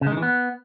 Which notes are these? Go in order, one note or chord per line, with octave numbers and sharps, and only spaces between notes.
C#3
G#3
D#3
E3
B3